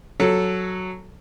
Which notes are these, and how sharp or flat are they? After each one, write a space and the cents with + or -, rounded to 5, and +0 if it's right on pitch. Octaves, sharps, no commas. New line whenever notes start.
F#3 +0 A4 -5 C#5 +0